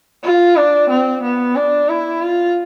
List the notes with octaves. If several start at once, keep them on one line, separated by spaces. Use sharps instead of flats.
F4
D4
C4
B3
D4
E4
F4